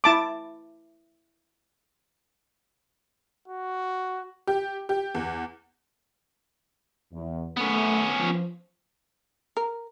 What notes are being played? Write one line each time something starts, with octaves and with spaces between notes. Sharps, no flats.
E4 A5 D6
F#4
G4
G4
E2
E2
A3 B3 C#4
F3
A#4